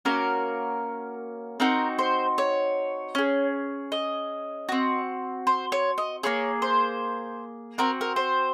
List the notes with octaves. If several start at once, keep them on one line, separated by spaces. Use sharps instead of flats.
A#3 C#4 F#4 A#4
C4 D#4 F#4 A#4
C5
C#5
C#4 G#4
D#5
C4 F#4
C5
C#5
D#5
A#3 F4 G#4 C#5
C5
C4 F#4 A#4
A#4
C5